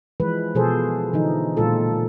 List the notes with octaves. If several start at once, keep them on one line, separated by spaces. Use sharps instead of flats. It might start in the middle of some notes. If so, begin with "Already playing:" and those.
E3 F3 G#3 B4
B2 F3 G#4 A4 C5
D3 E3 F3 D#4
A#2 E3 G#3 F4 A4